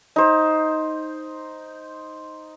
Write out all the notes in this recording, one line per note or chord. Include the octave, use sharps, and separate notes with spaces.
D#4 C5